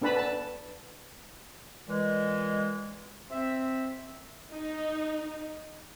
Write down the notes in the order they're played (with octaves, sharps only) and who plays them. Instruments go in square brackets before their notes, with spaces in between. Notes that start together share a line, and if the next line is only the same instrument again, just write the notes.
[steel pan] B3 D4 B4 A5 B5
A5
[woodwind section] A#2 E3 G#3
C4 E5
[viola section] D#4